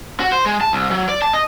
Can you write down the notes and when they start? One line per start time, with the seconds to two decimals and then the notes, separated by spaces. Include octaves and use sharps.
0.20 F#4
0.32 C5
0.46 G#3
0.61 A5
0.73 C2
0.91 F#3
1.09 D5
1.22 A5
1.33 D#5